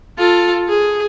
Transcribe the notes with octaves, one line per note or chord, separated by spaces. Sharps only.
F4 A4
G#4